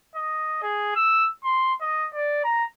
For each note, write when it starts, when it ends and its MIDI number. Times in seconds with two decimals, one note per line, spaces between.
0.15 0.61 75
0.62 0.91 68
0.95 1.29 88
1.44 1.74 84
1.81 2.07 75
2.14 2.41 74
2.44 2.64 82